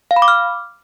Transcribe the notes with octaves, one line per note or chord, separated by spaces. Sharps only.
F5
B5
D6
F6